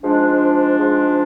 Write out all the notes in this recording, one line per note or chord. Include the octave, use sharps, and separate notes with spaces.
G#2 F3 G#3 D4
G#2 F3 G#3